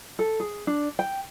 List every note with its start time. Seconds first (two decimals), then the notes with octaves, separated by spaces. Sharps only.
0.19 A4
0.40 G#4
0.67 D4
0.99 G5